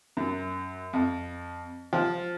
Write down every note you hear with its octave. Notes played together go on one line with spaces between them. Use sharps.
F#2
F2
F3